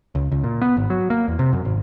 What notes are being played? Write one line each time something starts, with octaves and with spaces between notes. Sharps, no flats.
C#2
C#2
A#2
B3
G#1
F#3
A#3
E2
C3
F#2
G#1